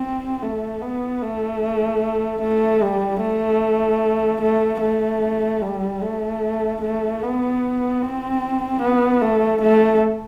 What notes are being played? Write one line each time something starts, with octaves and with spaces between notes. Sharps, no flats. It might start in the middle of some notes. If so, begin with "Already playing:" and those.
Already playing: C4
A3
B3
A3
A3
G3
A3
A3
A3
G3
A3
A3
B3
C4
B3
A3
A3